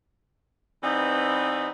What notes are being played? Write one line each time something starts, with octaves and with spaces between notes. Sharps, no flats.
E3 G3 B3 C4 D#4